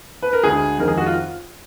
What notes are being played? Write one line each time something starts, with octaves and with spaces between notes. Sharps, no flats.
B4
A#4
D2 D3 G#3 G#4
F2 D#3 G#3 A#4
G#4
F#4
F4